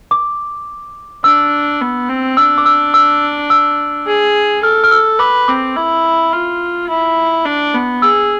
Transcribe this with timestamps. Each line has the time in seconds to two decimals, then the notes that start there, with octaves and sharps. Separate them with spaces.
0.11 D6
1.24 D4 E6
1.81 B3
2.08 C4
2.37 D4 E6
2.58 D6
2.66 E6
2.94 E6
3.50 E6
4.07 G#4
4.63 A4 F6
4.84 F6
4.91 E6
5.19 B4 D6
5.48 C4 D6
5.76 E4
6.33 F4
6.89 E4
7.45 D4
7.74 B3
8.02 G#4 E6